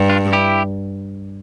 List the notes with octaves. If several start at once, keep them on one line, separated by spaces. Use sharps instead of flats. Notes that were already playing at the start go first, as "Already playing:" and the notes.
Already playing: G2
D4 F4
E4 G4